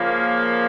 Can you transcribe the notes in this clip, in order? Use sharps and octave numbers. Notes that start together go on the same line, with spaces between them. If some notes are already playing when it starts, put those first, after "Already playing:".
Already playing: C#3 F3 A#3